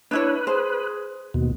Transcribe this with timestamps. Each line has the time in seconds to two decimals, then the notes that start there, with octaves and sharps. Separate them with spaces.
0.11 D4 E4 B4 C#5
0.47 G#4 C5
1.34 D#2 B2